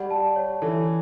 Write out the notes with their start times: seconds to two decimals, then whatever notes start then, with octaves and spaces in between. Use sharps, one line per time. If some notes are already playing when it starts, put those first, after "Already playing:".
Already playing: G3 F#5
0.10 A5
0.36 C#5
0.62 E3 A4